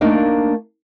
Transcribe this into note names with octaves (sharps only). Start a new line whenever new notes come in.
A3 A#3 D4 D#4 A#4 F5